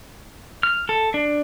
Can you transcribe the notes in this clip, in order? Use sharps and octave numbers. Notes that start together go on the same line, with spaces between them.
F6
A4
D4